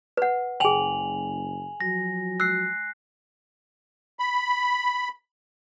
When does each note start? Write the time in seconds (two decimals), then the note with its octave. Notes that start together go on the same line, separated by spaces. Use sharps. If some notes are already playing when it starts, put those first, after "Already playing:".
0.17 B4 F#5
0.60 F#1 G#4 G5 G#5 F7 F#7
1.81 F3 F#3 F#4 A#6
2.40 E6 F#6 C7
4.19 B5